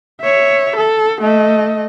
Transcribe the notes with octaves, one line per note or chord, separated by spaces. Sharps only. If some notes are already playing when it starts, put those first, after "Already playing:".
C#5 E5
A4
A3 D#5